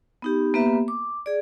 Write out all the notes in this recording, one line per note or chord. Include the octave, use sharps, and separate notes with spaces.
B3 D#4 G4
A#3 B3 G4 B4 E5
D6
G#4 D5